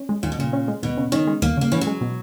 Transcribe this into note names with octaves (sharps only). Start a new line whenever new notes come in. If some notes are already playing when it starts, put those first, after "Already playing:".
Already playing: C#4
G#3
D#2 A#2
B2
A#2 C#3
C#4
G#3
D#2 B2
C#3
D#3 C#4
G#3
D#2 A#3
C#3 A#3
E3 C#4
F#3
G#3
B2